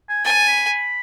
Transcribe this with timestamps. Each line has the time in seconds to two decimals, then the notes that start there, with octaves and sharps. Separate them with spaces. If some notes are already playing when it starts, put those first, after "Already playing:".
0.09 G#5
0.25 G#5 A5
0.48 B5